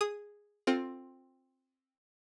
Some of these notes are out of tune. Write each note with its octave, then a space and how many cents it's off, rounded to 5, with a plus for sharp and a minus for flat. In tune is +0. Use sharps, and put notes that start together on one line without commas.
G#4 -5 D#6 +0
C4 +10 F4 +15 A4 +10